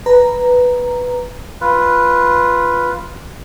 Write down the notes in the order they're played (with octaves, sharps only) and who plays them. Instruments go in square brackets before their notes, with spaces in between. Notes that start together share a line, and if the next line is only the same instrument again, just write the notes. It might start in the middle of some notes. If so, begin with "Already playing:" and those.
[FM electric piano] B4 A#5
[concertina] F4 B4